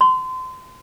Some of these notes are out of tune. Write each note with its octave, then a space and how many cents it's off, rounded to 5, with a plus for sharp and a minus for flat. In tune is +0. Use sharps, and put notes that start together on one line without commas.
C6 -30